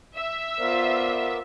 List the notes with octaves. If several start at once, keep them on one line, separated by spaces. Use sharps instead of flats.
E5
B3 F4 A#4 C5 D5